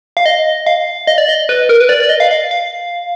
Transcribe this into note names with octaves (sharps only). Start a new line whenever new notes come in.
F5
D#5
F5
D#5
D5
D#5
B4
A#4
B4
D5
D5
D#5
F5
F5
F5